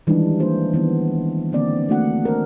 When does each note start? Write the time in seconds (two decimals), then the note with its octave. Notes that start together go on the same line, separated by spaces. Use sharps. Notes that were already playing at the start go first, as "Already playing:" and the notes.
0.07 D#3 E3 G3 G#3 D4 D#4
0.39 A#3 D4 F4 C5
0.73 D#3 E3 B3
1.52 D3 A#3 C4 D5
1.89 A3 A#3 D4 F#4 D5 F#5
2.24 F#4 A#4 C5